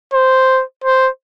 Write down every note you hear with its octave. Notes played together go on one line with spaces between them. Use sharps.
C5
C5